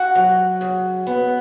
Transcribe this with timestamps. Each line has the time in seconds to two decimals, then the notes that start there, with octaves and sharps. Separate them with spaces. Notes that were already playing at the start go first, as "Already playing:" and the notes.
Already playing: F#4 F#5
0.15 F#3
0.61 C#3
1.07 B3